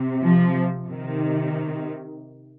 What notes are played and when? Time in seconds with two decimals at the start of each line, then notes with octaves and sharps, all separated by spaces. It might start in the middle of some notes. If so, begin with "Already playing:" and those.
Already playing: C3
0.22 F3
0.86 C3 D#3